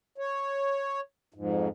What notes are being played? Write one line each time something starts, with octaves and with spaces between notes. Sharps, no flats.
C#5
F2 G#2